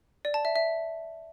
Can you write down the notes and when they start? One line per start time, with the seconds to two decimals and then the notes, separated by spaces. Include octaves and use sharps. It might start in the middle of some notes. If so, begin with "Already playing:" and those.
0.25 D5
0.34 A5
0.45 E5
0.56 E5